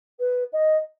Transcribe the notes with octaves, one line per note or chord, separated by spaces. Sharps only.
B4
D#5